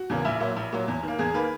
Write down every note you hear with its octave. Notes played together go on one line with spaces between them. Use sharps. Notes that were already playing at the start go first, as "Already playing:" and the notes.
Already playing: F#4
E2 C#3 E3 A#3
A#1 E4
A#2 F#3 E4
A#1
A#2 F#3
E2
D#3 A#3
E2 G#4
D#3 A#3 B4